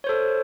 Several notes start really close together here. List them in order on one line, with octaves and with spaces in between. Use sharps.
C#5 C5 A4